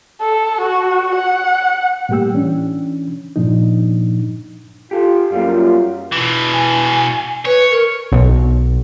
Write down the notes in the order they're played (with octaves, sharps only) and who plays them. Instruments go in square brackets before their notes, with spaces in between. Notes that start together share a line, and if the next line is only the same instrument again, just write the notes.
[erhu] A4
F#4
F#5
[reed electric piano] A2 G3 A#3 G4 G5 E6
E3 C#4 D4
G2 A#2 F3 D4 D#4
[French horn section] F4 [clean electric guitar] G4 A4
[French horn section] F#2 F4 [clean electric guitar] G3 A#3
[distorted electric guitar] B2 E3
[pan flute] G#5
[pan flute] B4 [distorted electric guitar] C#5
[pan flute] A#4
[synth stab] B1